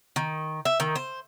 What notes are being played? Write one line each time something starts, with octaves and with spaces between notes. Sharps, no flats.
D#3
E5
D#3
C5